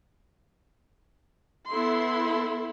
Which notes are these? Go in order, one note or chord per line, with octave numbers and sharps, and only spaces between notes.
B3 E4 A4 C6